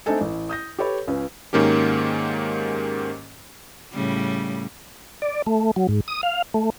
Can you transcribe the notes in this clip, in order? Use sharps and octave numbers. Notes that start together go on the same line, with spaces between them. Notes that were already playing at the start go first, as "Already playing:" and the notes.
A3 C4 D4 D#4 A4 G#5
A1
D#6 G6 A#6
G4 A4 B4 C#5 B5
C#2 C#4 B4
G#2 D#3 A#3 C#4 G4
A2 C#3 G3
D5
A3
F#3
G#2
D#6
F5
A3